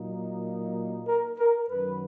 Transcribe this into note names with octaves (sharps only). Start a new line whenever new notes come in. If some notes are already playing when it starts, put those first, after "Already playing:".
Already playing: A#2 F#3 A#3 D#4
A#4
A#4
F#2 D#3 F#3 B4